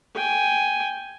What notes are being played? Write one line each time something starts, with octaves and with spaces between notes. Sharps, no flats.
G5 G#5